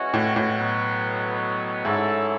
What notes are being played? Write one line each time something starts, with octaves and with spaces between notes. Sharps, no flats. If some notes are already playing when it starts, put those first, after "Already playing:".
Already playing: E3 G#3 C#4 F#4
A2
A2
B2 F#3 B3
G#2 F#3 A3 C#4 E4 A4